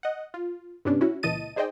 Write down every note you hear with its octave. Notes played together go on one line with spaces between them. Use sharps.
D#5 F#5
F4
G2 C3 G3 B3 C#4 D4
C#4 E4 F#4
C#2 A#2 E3 D#5 A5 D#7
D#4 G#4 C5 D5 D#5 G5